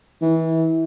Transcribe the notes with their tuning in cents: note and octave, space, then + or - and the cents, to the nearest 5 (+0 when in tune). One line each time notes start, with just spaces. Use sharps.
E3 -25